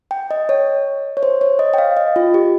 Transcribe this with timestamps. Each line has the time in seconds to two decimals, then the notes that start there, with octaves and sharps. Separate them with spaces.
0.11 G5
0.31 D#5
0.49 C#5
1.17 C#5
1.23 C5
1.41 C#5
1.59 D#5
1.74 G5
1.78 F5
1.97 D#5
2.16 F4
2.34 G4